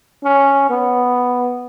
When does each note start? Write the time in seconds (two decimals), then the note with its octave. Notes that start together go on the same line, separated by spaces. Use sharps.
0.24 C#4
0.70 B3